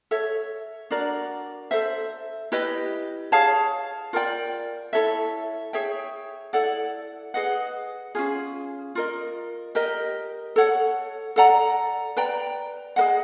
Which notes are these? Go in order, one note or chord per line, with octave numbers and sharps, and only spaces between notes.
A4 C#5 E5
D4 F#4 A#4 D5
A4 C5 E5
E4 G4 B4 D#5
G#4 C#5 F5 A5
F4 A#4 D5 G5
E4 A4 C#5 E5
G#4 C#5 E5 G5
E4 A4 D5 F#5
G#4 B4 D#5 F#5
C#4 F4 G#4
F4 A#4 D#5
G4 A#4 D#5
A4 C#5 F#5
A4 D5 F#5 A#5
B4 D5 G5 A#5
G#4 B4 D#5 F#5